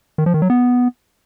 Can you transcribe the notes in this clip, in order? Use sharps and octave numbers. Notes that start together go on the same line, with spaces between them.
D#3
F3
D#3
F#3
B3